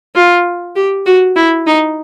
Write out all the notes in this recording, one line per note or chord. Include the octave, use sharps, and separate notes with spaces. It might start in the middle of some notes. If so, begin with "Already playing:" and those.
F4
G4
F#4
E4
D#4